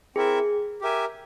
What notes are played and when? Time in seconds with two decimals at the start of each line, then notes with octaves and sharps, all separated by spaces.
0.16 C4 E4 G#4 A#4 E5
0.81 G4 A#4 E5 G#5